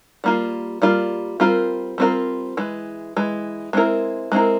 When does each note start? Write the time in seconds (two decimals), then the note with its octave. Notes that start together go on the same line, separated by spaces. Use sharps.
0.24 G3 A#3 F4
0.82 G3 A#3 F4
1.40 G3 C4 F4 A#4
1.98 G3 C4 F4 A#4
2.57 E3 G#3
3.16 E3 G#3
3.73 G#3 C4 E4 A#4
4.32 G#3 C4 E4 A#4